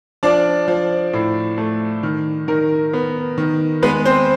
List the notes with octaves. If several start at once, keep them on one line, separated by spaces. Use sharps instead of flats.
F3 D4 D5
F3
A2
A3
D#3
D#3 A#4
B3
D#3
G#3 B3 B4
C4 C5